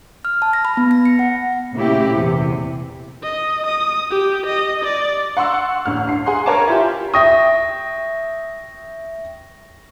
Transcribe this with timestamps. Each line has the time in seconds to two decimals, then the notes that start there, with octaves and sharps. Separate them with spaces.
0.25 F6
0.42 A5
0.53 A#6
0.65 B5
0.77 B3
0.91 A#6
1.06 C#7
1.19 F#5
1.74 A#2 C#3 A3 A#3 E4 G4
2.11 E2 C3
3.23 D#5
3.66 D#6
4.11 G4
4.46 D#5
4.84 D5
5.37 F#5 C6 C#6 E6
5.86 A1 D2 F6
6.07 G2 C7
6.26 G#4 F#5 C6
6.45 A#4 B4 C#5 G#5 A5 D6
6.68 E4 F4 G4
7.14 E5 G5 C#6 D#6 A#6